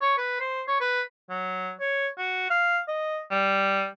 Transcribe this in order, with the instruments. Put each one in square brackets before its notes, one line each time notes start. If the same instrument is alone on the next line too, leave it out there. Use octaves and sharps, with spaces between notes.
[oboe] C#5
B4
C5
C#5
B4
[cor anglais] F#3
C#5
F#4
F5
D#5
G3